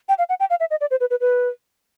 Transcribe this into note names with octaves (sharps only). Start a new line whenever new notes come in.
G5
F5
F#5
G5
F5
E5
D#5
D5
C5
B4
B4
B4